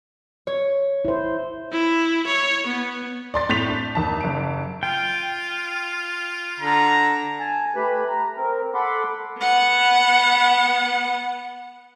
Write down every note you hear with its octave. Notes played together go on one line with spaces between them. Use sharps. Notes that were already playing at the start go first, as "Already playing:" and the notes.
C#5
E4 C5
E4
C#5
B3
D5 C6 A6
A2 G6 A6 B6 F7
D4
D#2 A5
F#1 D7
F4 G5
D3 A#5
G#5 A5
A3 G4 B4 B5
A#5
C4 A#4
A4 F#5 B5 C6 D6
B3 F#5